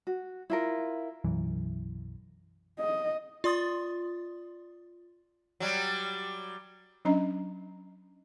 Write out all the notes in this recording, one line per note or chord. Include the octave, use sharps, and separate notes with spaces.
F#4
E4 F4 A#4
B1 F#2 E3
D#5
F4 D5 C6 D#6 A6
F#3 G3
F#3 C#4 D4 D#5 A#5